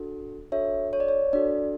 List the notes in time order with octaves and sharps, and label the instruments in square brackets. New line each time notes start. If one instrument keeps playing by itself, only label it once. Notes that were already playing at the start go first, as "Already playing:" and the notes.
Already playing: [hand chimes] D4 F#4 A4
D4 F#4 A4 C#5 E5
C#5
D5
C#5
D4 F#4 A4 D5